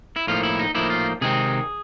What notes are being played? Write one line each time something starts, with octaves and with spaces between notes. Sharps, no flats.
E4
A2 F3 A#3 D#4 F4
E4
D#4
A2 F3 A#3 D#4 E4
F4
C3 D#3 G#3 C4 D#4 G#4